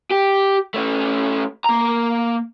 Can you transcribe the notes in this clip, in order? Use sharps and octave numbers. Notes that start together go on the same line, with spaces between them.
G4
A3 C#4
A#3 A#5